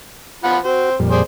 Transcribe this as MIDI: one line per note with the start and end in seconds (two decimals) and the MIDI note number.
0.44 0.58 53
0.44 0.58 78
0.44 0.58 83
0.65 0.95 60
0.65 0.90 66
0.65 0.95 72
0.99 1.23 41
0.99 1.23 46
0.99 1.23 55
1.11 1.21 68
1.11 1.21 72
1.11 1.21 74